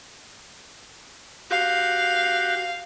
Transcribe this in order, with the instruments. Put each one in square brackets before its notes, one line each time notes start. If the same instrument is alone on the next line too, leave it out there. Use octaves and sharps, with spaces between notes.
[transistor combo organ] F#4 G4 [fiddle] F5